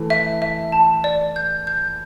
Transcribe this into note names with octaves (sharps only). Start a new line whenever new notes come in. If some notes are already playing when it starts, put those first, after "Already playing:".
Already playing: E3 A3
E5
E5
A5
D5
G6
G6